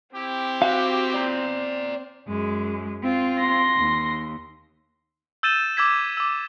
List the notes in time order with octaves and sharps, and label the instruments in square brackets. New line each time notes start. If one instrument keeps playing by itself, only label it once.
[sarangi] C4 [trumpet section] E4 G4
[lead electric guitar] F#4 [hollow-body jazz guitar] F5
[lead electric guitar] D5 A#5
[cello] F#2 G#3
C4 F4
[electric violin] C6 A#6
[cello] D#2
[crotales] E6 G6 A6 D#7 E7 G7
D6 E6 G#6 B6
D6 E6